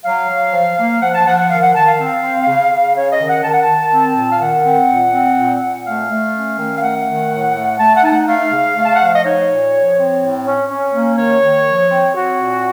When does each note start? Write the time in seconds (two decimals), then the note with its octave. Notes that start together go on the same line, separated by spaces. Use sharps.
0.05 F#3 F5
0.30 F#3
0.53 F3
0.78 A#3
1.02 F3 F#5
1.14 A5
1.26 F3 F#5
1.38 F#5
1.50 D#3 F5
1.63 F#5
1.75 D#3 A5
1.86 F5
1.99 C4
2.23 C4
2.47 C#3
2.71 C#3
2.95 C#4 C#5
3.12 D#5
3.20 D#3
3.28 F#5
3.44 D#3 A5
3.53 F#5
3.63 A5
3.68 D#3
3.92 C4
4.16 A#2
4.31 F5
4.40 D#3 F#5
4.65 C4
4.89 A#2
5.13 C4
5.38 A#2
5.62 A#2
5.86 A3 F5
6.10 A3
6.34 C#4
6.59 D#3
6.78 F5
6.83 A3 F#5
7.07 D#3
7.31 A2
7.55 A3
7.79 A3 A5
7.96 F#5
8.04 D#4 A5
8.12 F#5
8.28 A3 F5
8.52 C#3
8.76 A3
8.84 A5
8.94 F#5
9.00 F3 F5
9.15 D#5
9.24 D#4 C#5
9.49 A#2
9.73 F3
9.97 C4
10.22 A2
10.46 C#4
10.70 C#4
10.94 A#3
11.18 D#3 C#5
11.43 D#3
11.67 F3
11.91 C4
12.15 C4 F#4
12.39 A#2